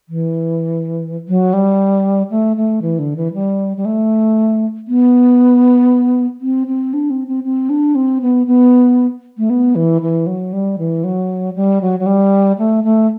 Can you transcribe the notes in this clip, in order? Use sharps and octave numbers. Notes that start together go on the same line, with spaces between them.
E3
F#3
G3
A3
A3
E3
D3
E3
G3
G3
A3
B3
C4
C4
D4
C4
C4
C4
D4
C4
B3
B3
A3
B3
E3
E3
F#3
G3
E3
F#3
G3
F#3
F#3
G3
A3
A3